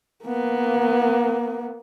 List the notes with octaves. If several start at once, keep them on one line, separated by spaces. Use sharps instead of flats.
A#3 B3